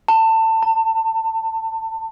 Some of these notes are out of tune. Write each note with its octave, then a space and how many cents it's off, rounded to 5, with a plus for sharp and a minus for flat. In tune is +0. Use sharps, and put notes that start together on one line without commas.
A5 +25
A5 +45